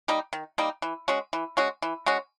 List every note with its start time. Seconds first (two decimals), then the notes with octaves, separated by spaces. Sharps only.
0.08 G3 A#3 D#4
0.33 D#3
0.58 G3 A#3 D#4
0.82 E3
1.08 G#3 C#4 F#4
1.33 E3
1.57 G#3 C#4 F#4
1.82 E3
2.06 G#3 C#4 F#4